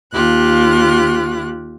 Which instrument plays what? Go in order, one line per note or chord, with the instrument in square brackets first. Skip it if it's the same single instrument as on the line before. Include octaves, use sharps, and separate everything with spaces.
[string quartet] D#2 F4 G4 F#6